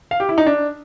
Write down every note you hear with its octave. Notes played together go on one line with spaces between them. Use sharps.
F5
G4
E4
D#4
D4